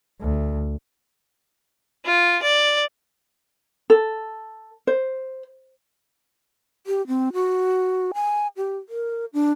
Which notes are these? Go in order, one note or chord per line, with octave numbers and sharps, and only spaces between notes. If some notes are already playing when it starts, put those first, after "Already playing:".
D2
F4
D5
A4
C5
G4
C4
F#4
G#5
G4
A#4
D4